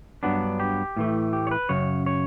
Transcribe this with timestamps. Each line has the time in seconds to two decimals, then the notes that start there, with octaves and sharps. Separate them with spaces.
0.23 G2 F#3 B3 D4
0.60 G4
0.97 A2 E3 A3
1.33 G4
1.47 C#5
1.51 B4
1.69 F#2 C#3 C#5
2.06 C#5